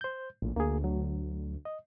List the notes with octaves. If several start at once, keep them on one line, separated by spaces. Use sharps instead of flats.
C5 G6
A#1 A2
D2 A#3 G#4
F#3
D#5